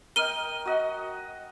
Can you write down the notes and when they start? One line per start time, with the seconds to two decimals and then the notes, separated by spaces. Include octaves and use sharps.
0.16 A#4 D#5 G5 F6 D#7 G7
0.65 F#4 D#5 F#5